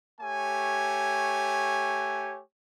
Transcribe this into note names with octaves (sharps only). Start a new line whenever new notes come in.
A3 G4 C#5 G#5